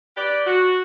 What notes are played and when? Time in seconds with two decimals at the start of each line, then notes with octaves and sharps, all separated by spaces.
0.17 G4 B4 D5
0.46 F#4